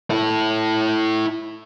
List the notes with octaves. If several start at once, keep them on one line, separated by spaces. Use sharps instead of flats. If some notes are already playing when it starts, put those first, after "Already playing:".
E4 A4